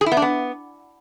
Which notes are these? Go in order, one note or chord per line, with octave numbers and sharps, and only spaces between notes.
G#4
E4
B3
D4
B3